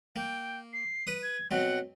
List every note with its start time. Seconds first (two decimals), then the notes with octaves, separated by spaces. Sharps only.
0.16 A#3 G5
0.73 C7
1.07 B4 D#6
1.23 G#6
1.51 B2 F#3 C4 F#5